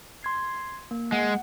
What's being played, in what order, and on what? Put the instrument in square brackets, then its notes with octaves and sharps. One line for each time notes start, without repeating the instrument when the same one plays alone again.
[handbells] C6 G#6 C7
A#3
[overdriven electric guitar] G#3 [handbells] F#5